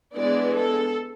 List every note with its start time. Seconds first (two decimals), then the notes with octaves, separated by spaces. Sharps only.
0.15 E3 G#3 B3 D4 D5
0.56 A4